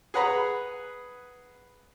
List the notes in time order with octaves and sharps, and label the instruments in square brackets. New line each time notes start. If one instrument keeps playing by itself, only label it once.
[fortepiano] G#4 B4 F#5 A#5 B5